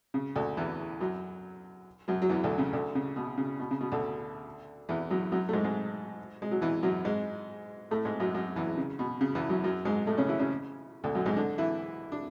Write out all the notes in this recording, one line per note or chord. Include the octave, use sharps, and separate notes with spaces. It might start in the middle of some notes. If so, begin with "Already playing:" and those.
C#3
D2 D3
E2 E3
F#2 F#3
F#2 F#3
F#3
E2 E3
D2 D3
C#3
D2 D3
C#3
B2
C#3
B2
C#3
B2
D2 D3
E2 E3
F#2 F#3
F#2 F#3
A3
G#2 G#3
G#2 G#3
G#3
F#3
E2 E3
F#2 F#3
G#2 G#3
A2 A3
G#2 G#3
F#2 F#3
F#2 F#3
E2 E3
C#3
B2
C#3
E2 E3
F#2 F#3
F#2 F#3
G#2 G#3
A2 A3
C#3 C#4
E3 E4
C#3 C#4
D2 D3
F#2 F#3
G#2 G#3
D3 D4
E3 E4
D4